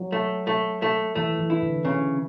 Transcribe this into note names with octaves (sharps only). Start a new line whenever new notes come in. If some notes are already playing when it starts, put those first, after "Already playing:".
Already playing: F#3
A3
A3
A3
E3 A3
E3
E4
D3
C#3